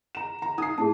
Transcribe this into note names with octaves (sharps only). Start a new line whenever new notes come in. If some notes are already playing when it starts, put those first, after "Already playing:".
A#5 E7
A#5
D#4 D#6 C7
A2 G#4 A5